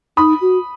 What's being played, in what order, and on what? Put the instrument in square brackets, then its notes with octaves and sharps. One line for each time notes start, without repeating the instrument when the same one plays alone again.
[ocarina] D#4 [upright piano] B5 D#6
[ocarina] F#4